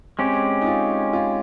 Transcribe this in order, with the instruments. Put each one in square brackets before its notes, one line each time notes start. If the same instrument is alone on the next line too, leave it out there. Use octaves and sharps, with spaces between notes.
[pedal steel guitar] G#3 C#4 G4 [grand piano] C4
[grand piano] D#4
F4
F4